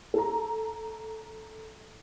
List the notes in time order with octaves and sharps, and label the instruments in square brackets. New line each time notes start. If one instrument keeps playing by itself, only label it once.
[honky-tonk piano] A4 A#5